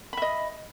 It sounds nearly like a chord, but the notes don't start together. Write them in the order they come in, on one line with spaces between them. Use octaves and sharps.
B5 E5 D#5